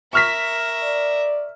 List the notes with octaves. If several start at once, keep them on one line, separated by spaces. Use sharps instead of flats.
A#4 E5 C#6 F6 B6
D5